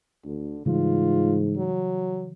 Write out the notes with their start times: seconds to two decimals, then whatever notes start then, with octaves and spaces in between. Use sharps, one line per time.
0.24 D2 D3
0.66 G#2 C#3 E3 G3 F4
1.57 F#3